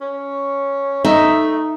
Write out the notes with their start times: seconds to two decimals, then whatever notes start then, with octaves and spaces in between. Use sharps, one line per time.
0.01 C#4
1.05 A3 D#4 E5